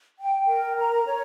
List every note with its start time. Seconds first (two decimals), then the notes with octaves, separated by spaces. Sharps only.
0.19 G5
0.48 A#4
0.78 A#5
1.07 C#5